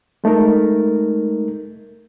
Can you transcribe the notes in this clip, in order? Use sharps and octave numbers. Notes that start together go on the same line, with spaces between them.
G#3 A3 D#4 A#4